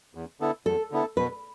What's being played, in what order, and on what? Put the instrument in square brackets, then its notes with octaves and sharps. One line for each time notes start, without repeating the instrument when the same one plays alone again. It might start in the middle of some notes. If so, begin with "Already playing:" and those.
[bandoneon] E2
D3 B3 E4 A4
[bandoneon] E2 [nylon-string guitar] A4
[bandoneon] D3 B3 E4 A4
[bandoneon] B2 [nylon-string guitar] B4